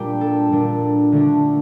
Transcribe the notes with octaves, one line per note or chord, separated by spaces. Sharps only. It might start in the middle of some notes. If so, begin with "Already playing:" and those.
Already playing: A#2 G3 D4 G4
A4
A#2 G3 D4
D3 A3 D4